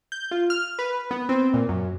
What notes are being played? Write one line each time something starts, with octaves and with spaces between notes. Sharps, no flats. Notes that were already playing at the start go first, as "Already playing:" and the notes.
G6
F4
F6
B4
B3
C4
A#2
F#2